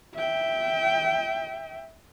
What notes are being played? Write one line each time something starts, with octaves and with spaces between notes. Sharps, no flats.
E5 G5